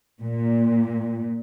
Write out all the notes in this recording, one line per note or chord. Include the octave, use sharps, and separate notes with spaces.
A#2